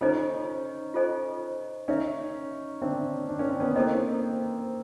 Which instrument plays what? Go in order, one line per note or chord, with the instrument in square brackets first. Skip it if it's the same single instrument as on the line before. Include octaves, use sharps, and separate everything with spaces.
[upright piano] C#4 D#4 [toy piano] F4 A4 C5 D#5 G#5
[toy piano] F4 A4 C5 D#5 G#5
[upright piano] C#4 D#4 [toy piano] A#4 C#5 E5
[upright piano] C4 D4 [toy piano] A#4 C#5 E5
[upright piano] D4
C#4
C4
B3 C#4
[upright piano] A#3 C4 [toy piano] E4 A4 C5 D#5